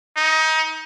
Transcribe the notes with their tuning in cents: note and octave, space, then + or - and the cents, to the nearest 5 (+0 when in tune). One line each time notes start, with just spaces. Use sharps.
D#4 +25